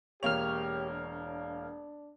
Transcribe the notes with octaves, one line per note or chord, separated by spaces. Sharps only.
E1 A#3 G4 C#5 F6 F7
D4